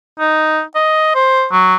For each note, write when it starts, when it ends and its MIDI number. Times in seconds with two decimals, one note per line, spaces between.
0.20 0.62 63
0.75 1.13 75
1.15 1.46 72
1.52 1.77 54